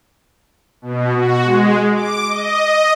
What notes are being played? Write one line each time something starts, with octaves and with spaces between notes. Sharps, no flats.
B2
F#4
G#3
D6
D#5
D#5